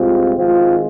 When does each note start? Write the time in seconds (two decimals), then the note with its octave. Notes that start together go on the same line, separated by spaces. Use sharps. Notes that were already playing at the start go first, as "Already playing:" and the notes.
Already playing: C2 C3 G#3 C4 F4
0.37 G#1 G#2 G#3 C4 F4